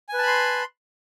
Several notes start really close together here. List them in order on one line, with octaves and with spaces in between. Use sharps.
G#5 B4 A5 B5 C6